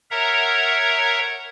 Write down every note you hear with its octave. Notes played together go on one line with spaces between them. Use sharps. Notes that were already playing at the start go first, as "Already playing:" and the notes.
A#4 C#5 E5 F#5 A#5